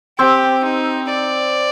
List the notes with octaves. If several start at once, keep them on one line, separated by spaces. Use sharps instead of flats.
C4 G4
D#4
D5